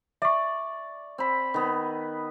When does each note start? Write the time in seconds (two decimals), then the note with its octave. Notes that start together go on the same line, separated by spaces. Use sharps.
0.22 D5 E5 C#6
1.18 C4 B5
1.54 D#3 B3